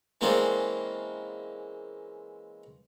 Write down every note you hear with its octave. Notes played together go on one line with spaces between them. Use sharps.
E3 G#3 A#3 C4 C#4 D5